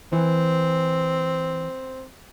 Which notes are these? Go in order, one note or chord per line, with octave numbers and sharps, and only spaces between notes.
E3 C4